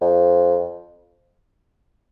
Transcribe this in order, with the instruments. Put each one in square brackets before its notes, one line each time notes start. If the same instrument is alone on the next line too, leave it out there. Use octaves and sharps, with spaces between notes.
[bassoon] F2